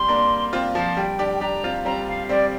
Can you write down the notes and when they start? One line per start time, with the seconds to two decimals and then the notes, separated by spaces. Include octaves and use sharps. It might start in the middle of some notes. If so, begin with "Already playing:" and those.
Already playing: G3 C4 C6
0.09 A#3 D4
0.53 C4 F4
0.75 F3
0.97 G3 G5
1.19 D4 G4
1.35 G5
1.41 D4 G4 A#5
1.64 C4 F4
1.85 G3 C4 A#5
2.08 F5
2.29 G3 C4 D5